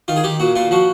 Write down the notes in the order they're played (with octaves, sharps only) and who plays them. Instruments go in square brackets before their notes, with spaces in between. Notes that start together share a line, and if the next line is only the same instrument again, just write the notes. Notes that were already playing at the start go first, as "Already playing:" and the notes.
[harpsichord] D#3 F4
G#4
D#3 G4
A#2 F#4
A#2 F4
F3 F#4